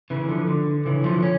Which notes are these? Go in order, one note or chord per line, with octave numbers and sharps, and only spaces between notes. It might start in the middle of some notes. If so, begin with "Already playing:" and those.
C#3 E3
D3 F3
D3
C#3 E3
D3 F3
C#4